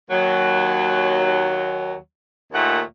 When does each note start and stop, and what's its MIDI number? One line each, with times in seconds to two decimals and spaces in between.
0.09 1.95 39
0.09 1.95 54
2.53 2.81 39
2.53 2.81 46
2.53 2.81 57
2.53 2.81 78